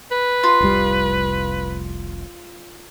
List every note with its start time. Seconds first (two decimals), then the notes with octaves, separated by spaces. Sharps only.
0.12 B4
0.43 F4
0.60 F1 C2 G3